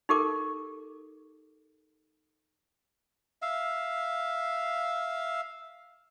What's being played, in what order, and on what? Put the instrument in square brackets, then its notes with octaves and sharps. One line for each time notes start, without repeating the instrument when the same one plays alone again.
[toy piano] D#4 G4 A4 A#4 D6
[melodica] E5 F5